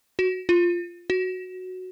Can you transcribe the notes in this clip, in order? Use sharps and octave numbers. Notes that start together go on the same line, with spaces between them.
F#4
F4
F#4